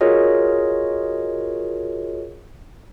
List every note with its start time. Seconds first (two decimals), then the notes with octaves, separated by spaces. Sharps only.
0.01 F4 F#4 G#4 A#4 C#5 D#5